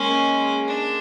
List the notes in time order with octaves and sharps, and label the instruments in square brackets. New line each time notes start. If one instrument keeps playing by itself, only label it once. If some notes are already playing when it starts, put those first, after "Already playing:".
Already playing: [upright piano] G#3 A#3 [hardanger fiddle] C#4
[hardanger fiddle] D4